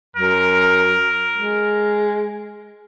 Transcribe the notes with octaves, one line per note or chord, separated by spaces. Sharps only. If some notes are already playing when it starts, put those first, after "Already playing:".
F#2 A#4
G#3